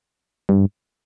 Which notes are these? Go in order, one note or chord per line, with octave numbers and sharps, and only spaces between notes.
G2